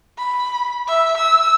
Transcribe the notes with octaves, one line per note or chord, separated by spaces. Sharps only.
B5
E5
E6